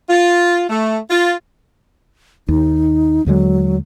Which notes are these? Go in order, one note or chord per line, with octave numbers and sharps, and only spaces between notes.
F4
A3
F4
D#2 D#4
D#2 D3 F#3 G#3